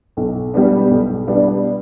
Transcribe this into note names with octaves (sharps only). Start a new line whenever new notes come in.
B1
B2 G3 B3 D4
B1
B2 G3 B3 D4